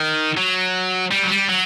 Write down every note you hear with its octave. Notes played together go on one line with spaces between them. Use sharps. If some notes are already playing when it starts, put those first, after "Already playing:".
Already playing: D#3
F#3
G3
F#3
G3
F#3